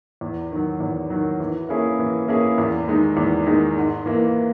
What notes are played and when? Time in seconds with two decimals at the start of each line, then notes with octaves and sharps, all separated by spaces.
0.21 E2
0.52 D#3 F#3
0.80 E2
1.10 D#3 F#3
1.40 E3
1.69 A#3 C#4 E4 G#4
1.99 E3
2.28 A#3 C#4 E4 G#4
2.58 E2
2.88 D#3 G#3 D#4
3.17 E2
3.46 D#3 G#3 D#4
3.77 G#2
4.06 E3 A#3